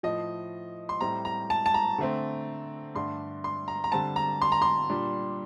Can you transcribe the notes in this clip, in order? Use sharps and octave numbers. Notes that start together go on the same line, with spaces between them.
A2 F3 A3 D#5
C6
A2 G3 C4 A#5
A#5
A5
A5
A#5
D3 A3 C4
G2 D3 A3 D4 C6
C6
A#5
A#5
D3 G3 C4 A5
A#5
C6
A#5
C6
A#2 G3 D4